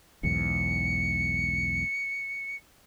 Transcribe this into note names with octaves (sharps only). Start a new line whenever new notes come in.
B1 E2 G#2 C#7